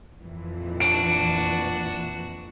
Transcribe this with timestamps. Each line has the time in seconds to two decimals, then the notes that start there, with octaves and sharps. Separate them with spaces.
0.21 F2 A#2 E3
0.80 D4 F#4 D7